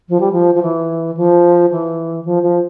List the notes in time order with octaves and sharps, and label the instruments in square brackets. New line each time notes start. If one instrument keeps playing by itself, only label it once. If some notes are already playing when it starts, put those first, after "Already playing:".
[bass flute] F3
G3
F3
F3
E3
F3
E3
F3
F3